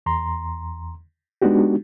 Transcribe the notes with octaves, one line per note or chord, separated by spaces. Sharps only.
E2 A#5 C6
G#3 B3 D4 D#4 F#4 G4